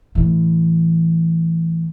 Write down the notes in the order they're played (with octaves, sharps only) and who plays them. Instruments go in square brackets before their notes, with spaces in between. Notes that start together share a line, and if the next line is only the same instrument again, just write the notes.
[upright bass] A2 E3